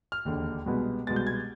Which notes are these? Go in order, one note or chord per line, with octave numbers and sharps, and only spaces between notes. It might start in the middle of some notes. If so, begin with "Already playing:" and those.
F6
E1 D#2 D3
C2 B2 G#3 B3
C2 B2 G#3 B3 A6
G6
G#6